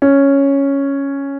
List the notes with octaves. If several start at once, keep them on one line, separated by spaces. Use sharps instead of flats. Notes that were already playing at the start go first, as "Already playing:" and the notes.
C#4